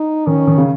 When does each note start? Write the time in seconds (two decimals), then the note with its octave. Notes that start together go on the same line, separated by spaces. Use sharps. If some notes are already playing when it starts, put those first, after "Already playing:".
Already playing: D#4
0.27 D#3 C#4
0.48 D#3
0.58 C#3